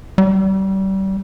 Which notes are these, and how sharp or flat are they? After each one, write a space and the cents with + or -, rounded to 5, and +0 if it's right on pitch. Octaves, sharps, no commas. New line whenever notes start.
G3 -30